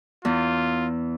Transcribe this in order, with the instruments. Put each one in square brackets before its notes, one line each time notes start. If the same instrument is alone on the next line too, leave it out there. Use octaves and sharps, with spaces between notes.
[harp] E2 [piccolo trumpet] F4